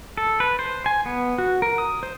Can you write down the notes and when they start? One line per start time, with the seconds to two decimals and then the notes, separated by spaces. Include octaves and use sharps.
0.17 A4
0.40 B4
0.59 C5
0.86 G#5
1.06 B3
1.38 F#4
1.62 A#4
1.78 D#6
2.03 C5